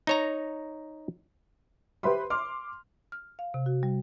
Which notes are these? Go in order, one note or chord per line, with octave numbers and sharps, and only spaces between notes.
D#4 C#5 A#5
G4 B4 C5 E5 B5 C6
C6 D6 F6
F6
F5
C3
F#4
G3